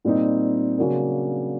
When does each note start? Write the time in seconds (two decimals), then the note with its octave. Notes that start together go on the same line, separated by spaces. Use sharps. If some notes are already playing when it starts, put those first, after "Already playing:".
0.05 A#2 G3 C4 D#4
0.78 C#3 F#3 A#3 D4